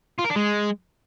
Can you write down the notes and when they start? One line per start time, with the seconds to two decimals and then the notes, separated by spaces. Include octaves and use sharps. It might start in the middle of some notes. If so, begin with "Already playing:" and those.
0.19 F4
0.25 A#4
0.31 D4
0.36 G#3